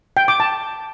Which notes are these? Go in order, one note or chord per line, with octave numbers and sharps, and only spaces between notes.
G5
D6
A5